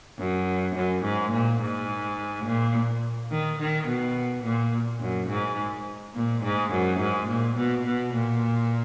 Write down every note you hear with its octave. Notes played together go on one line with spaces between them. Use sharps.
F#2
F#2
G#2
A#2
G#2
A#2
D#3
D#3
B2
A#2
F#2
G#2
A#2
G#2
F#2
G#2
A#2
B2
B2
A#2